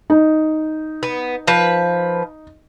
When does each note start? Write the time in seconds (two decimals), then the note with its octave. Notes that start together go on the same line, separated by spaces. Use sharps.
0.10 D#4
1.03 B3
1.47 F3 B4